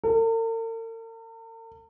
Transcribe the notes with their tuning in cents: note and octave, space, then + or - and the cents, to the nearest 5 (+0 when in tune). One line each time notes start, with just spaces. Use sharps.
A#4 -45